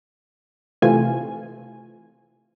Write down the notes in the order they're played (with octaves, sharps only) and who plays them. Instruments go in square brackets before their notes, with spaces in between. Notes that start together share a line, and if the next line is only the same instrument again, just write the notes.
[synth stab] C3 E3 A3 C4 F4 G#5